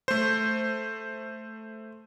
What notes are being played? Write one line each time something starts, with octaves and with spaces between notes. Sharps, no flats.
A3 C5